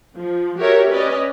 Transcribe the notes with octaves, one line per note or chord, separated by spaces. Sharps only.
F3
F#4 G4 A#4 C#5 E5
C#4 B4 D5 D#5